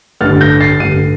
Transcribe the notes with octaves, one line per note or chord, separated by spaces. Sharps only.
A1 G2 D3 F6 A6
G6 A#6
A6 C7
A1 G2 D3 C7 D#7